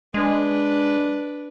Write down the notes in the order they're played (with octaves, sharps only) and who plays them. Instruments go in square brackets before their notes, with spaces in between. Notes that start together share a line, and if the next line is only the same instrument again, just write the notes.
[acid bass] G#3 [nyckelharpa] D4 B4